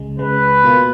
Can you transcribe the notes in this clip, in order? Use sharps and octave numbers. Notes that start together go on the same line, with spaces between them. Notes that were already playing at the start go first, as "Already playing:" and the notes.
Already playing: C#2 C#3 G#3
C#2 C#3 G#3 B4
B2 A#3 F4